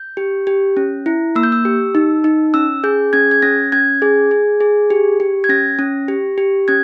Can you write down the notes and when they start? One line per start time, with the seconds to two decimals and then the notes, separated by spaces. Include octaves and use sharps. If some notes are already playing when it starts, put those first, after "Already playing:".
Already playing: G6
0.17 G4
0.47 G4
0.77 C#4
1.06 E4
1.35 A#3 E6
1.43 G6
1.52 E6
1.65 G4
1.95 D#4
2.24 D#4
2.54 C#4 E6
2.84 G#4 G6
3.13 C#4 G#6
3.31 G#6
3.42 C#4 A#6
3.72 C#4 G#6
4.02 G#4
4.31 G#4
4.61 G#4
4.90 G4
5.20 G4
5.44 G#6
5.49 C#4 A#6
5.79 C#4
6.08 G4
6.38 G4
6.68 C#4 G#6